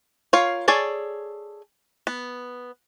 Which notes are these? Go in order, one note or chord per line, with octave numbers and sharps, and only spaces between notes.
F4 A#4 C#5 F5
G#4 A4 C#5 D5
B3